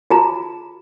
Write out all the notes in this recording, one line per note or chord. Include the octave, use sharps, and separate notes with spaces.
F4 F#4 G#4 A5 A#5